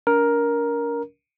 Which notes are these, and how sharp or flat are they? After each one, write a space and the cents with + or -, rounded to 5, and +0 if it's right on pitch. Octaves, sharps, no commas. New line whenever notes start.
D4 -45 A#4 +10